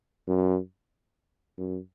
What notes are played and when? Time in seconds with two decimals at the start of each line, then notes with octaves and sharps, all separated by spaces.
0.28 F#2
1.58 F#2